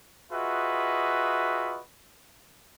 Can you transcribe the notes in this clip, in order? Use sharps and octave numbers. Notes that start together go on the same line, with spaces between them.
F4 F#4 G#4 B4 D#5 E5